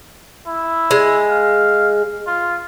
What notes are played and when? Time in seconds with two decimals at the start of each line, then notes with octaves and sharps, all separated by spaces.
0.47 E4
0.91 G#3
1.29 F5
2.27 F4